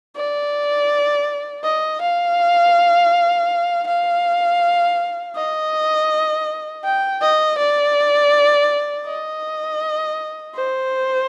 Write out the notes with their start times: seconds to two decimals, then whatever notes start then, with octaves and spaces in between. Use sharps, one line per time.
0.16 D5
1.64 D#5
2.01 F5
3.87 F5
5.35 D#5
6.84 G5
7.21 D#5
7.58 D5
9.06 D#5
10.55 C5